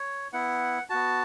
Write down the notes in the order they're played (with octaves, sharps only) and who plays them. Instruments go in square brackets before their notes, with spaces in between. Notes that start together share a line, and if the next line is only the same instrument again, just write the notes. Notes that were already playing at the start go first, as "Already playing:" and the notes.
Already playing: [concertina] C#5
B3 E4 F#5
B3 F#4 A5